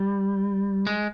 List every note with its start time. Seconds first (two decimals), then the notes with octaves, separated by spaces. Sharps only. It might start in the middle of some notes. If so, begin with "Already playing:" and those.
Already playing: G3
0.87 G#3